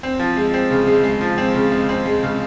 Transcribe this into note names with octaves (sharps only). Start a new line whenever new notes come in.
C4
F3
G#3
C4
C#3
G#3
G#3
F3
C4
C#3
G#3
C4
G#3
C#3